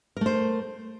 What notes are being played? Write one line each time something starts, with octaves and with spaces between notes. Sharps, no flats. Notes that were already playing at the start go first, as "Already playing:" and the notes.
A3 A#4 C5